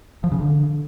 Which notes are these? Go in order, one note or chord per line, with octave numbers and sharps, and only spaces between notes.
F3
C#3
D3